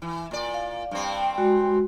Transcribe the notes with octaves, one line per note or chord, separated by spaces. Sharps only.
E3
A#2 D5
F5
G2 C4
G#3 F#4